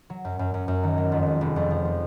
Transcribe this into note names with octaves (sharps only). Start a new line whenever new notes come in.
F#3
F#2
F#2
F#2
F#2
D#3
F#3
F2
G#3
F1
F2
F3
F3